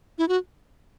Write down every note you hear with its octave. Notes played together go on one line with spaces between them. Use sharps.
E4
F#4